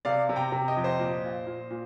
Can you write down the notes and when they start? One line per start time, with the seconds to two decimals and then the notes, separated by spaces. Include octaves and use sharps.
0.05 C3 D5 F5
0.29 C3
0.36 G5 A#5
0.52 C3
0.68 D#5 G5
0.77 F2
0.84 C5 D#5
0.99 A#2
1.24 A#2
1.47 A#2
1.71 A#2